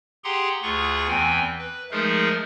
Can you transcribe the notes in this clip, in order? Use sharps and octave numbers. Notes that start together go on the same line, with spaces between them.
G4 G#4 F#5 G5 A#5 C6
D2 F4 G#4 F#5 C#6
E2 E3 C4 G5 G#5
B4
F3 G#3 A3 D#4 G#4 A#4